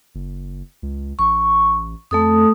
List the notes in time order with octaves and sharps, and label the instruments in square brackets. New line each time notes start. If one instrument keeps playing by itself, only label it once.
[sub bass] F#1
C#2
[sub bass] A1 [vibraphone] C#6
[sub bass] F2 [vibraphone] A3 A4 D#6